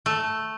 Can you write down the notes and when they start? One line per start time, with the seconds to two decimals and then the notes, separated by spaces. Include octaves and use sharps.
0.06 A3